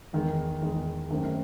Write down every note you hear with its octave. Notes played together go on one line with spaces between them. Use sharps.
E2 D#3 G#3
E2 D#3 G#3
F#2 D#3 A3 C4